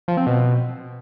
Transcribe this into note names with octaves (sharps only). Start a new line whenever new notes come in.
F3
C4
B2